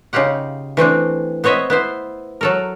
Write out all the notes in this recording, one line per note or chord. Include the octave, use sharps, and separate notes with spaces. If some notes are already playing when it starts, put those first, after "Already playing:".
C#3 D#4 F4 G4 F#5
E3 A3 C4 D4
B3 C4 C#5 D#5 E5
B3 E4 C5
F#3 A4 A#4